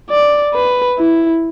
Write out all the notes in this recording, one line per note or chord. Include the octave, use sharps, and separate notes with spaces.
D5
B4
E4